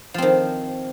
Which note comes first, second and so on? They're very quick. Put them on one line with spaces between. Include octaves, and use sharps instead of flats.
F3 C4 D#3